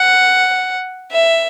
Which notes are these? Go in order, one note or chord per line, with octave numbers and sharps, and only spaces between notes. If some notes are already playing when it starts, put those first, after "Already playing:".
Already playing: F#5
E5